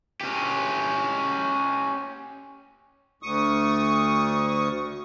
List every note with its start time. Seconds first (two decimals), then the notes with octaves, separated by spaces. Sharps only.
0.21 C#4 G4
3.23 D2 C#6 D#6